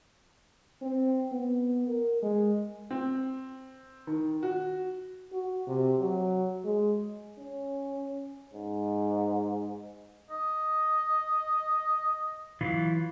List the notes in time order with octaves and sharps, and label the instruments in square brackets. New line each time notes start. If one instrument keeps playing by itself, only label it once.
[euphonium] C4
B3
A#4
G#3
[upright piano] C4
D#3
F#4
[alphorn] F#4
C3
F#3
G#3
[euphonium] C#4
G#2
[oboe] D#5
[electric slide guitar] E3 F#3 F4